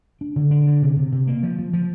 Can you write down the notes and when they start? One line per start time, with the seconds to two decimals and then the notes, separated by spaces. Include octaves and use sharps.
0.21 D4
0.36 D3
0.51 D4
0.67 D3
0.82 C3
0.97 C3
1.12 C3
1.27 A#3
1.43 F3
1.59 F3
1.73 F3